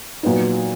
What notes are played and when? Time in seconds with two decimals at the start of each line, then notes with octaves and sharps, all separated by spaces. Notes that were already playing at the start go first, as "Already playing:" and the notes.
0.23 A#2 F#3 B3 D#4